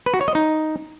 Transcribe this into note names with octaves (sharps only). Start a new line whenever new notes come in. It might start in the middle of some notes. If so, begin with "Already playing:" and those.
B4
F#4
C#5
D#5
D#4